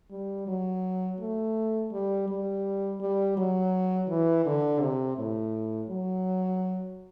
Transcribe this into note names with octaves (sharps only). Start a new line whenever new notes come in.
G3
F#3
A3
G3
G3
G3
F#3
E3
D3
C3
A2
F#3